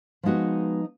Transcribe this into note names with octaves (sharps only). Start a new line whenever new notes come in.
F3 G#3 B3 D#4 F#4